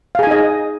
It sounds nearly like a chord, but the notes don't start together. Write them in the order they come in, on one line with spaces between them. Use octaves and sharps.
F5 G#4 G#5 D#4 D#5